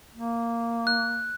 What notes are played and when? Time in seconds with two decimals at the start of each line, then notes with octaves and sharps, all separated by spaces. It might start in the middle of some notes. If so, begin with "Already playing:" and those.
0.15 A#3
0.87 F#6